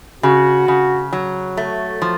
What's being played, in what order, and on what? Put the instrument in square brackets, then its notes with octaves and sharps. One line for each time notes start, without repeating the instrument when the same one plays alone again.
[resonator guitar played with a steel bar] C#3 [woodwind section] F#4
[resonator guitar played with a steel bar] C#3
F#3
A3
F3